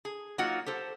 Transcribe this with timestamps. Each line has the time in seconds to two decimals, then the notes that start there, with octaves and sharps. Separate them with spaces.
0.05 G#4
0.38 F#3 A#3 D#4 F4 F#4 F#5
0.66 G4 A4 C5